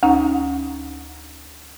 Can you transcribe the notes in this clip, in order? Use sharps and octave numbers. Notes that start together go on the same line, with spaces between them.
D2 C#4 D#4 A#5